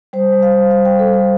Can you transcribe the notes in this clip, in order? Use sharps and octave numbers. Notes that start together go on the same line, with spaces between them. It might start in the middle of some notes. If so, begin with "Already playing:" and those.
G3 C5
G3
F5
G3
G3 F5
G3 G5
A4
G3 G5